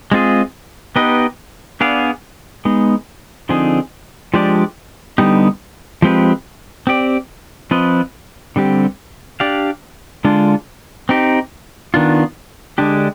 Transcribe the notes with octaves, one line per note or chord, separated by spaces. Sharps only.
G#3 C4 F4 G#4
B3 D#4 G4 B4 D#5
B3 D4 G#4 D5 F5
G#3 B3 D#4
D3 F3 C4 D#4 G#4
F3 G#3 D4 G4 D5
D3 G3 B3 D#4 G4
F3 G#3 C4 G4 B4
C4 G4 D5
F3 C4 F4 B4 D#5
D3 G3 C4 G4
D4 G4 D5 F5
D3 G#3 D4 F4
C4 D#4 G4
D#3 B3 D4 F4
D3 G#3 D4 G4